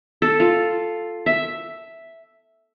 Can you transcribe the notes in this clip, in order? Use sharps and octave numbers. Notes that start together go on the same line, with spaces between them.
A4
F4
E5